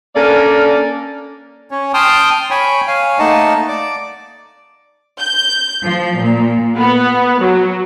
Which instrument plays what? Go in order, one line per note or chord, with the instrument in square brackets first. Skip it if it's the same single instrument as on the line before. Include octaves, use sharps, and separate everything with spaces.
[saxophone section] A#3 C#4 D4 A4 A#4 D5
[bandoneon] C#4 C#5
G5 A5 C6 D#6 F6
C#5 G5 G#5 B5 C#6
C#5 F5 G#5
A3 A#3 D#4 D#5 F#5 A5
D5 D6
[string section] G6
F3
A#2
B3
F#3